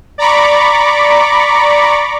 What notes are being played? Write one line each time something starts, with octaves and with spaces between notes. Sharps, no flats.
D5 A#5 B5 C#6 D6